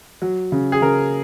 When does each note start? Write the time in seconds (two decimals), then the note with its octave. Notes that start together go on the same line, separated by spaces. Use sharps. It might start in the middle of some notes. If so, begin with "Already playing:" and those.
0.22 F#3
0.52 C#3
0.72 G#4
0.82 C#3 A#4